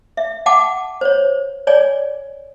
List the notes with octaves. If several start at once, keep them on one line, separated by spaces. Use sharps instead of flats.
E5
F#5 G5 A5 D6
C5 C#5
C#5 D5 G#5